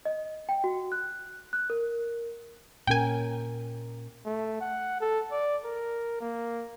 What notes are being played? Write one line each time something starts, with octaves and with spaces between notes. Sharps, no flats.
D#5
G5
F#4
F#6
F#6
A#4
A#2 C#4 A#4 G5 G#5
A3
F#5
A4
D5
A#4
A#3